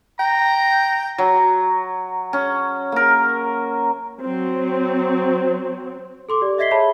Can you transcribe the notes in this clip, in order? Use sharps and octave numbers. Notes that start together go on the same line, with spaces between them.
G5 A#5
F#3
C#4
A#3 A#4
F#3 C4
A4 C6 D6
G4 D5
D#5 E5 G#6 B6 C7 G7
G#4 C#5 E5 A5 B5